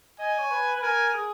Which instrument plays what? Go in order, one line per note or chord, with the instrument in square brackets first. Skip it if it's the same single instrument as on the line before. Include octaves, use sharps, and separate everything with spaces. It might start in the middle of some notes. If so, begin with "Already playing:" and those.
[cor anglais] D#5 [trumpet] G#5
[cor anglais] C#5
B4
B4
[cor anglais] A#4 [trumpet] G#5
[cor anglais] G#4